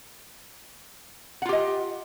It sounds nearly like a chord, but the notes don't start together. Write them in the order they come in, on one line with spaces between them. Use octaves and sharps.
F#5 F4 G4 D#5